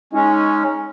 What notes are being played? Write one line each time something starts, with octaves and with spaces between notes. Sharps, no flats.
G#3 C#4 D#4